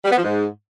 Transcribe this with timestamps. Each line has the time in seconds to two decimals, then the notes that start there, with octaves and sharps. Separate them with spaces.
0.05 G3
0.11 B3
0.17 F3
0.24 G#2